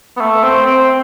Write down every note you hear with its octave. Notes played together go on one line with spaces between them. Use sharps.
B3
A3
C4
C4